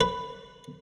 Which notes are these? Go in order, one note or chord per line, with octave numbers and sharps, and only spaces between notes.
B4